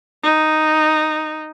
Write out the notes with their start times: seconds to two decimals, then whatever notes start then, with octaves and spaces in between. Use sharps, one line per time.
0.23 D#4